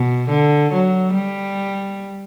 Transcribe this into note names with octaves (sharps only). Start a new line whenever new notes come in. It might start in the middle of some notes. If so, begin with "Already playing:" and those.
Already playing: B2
D3
F#3
G3